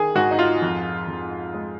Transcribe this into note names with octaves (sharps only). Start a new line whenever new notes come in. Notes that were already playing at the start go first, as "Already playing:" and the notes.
Already playing: D#3 G#4
G#2 F#4
D#4
F4
F2
F2
G#3